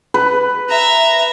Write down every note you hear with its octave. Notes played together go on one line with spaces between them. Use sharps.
B4
E5 A#5